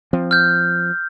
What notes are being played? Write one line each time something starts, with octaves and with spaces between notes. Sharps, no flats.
F3 C4
F6 G6